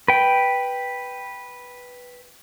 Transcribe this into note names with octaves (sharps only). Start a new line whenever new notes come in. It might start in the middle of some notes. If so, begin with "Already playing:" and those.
B4 G5